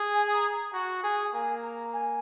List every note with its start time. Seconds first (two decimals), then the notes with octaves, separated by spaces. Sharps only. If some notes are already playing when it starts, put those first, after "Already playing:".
Already playing: G#4
0.13 G#5
0.33 A#5
0.53 A#5
0.73 F#4
1.03 G#4 G#5
1.33 A#3 G#5
1.63 A#5
1.93 G#5